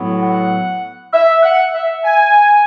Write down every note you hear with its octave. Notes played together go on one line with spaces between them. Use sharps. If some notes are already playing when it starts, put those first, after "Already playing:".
Already playing: A2 F#3 B3
F#5
E5
F#5
E5
G#5